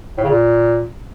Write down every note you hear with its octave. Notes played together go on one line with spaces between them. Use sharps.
A2
C#3
A#2